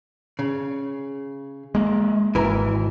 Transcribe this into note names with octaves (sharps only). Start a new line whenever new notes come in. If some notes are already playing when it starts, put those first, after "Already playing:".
C#3
G#3 A#3
G#1 E3 A#4